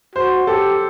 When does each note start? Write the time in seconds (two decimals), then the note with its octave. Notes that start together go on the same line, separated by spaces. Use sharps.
0.15 F#4 C5
0.47 G4 A4